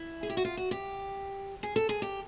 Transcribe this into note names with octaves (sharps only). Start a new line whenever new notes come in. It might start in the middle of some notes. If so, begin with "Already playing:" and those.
Already playing: E4
G#4
G4
F#4
F4
F#4
G4
G#4
A4
G#4
G4